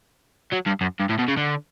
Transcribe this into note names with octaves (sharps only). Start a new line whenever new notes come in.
F#3
G2
F#2
G2
A2
B2
C#3
D3